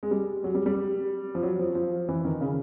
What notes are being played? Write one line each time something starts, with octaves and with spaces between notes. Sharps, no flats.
G#3
G3
F#3
G3
G3
F3
F#3
F3
F3
E3
D#3
C#3